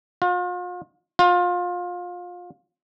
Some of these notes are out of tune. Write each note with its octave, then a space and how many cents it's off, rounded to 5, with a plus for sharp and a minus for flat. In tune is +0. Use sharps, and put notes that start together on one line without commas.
F4 +40
F4 +25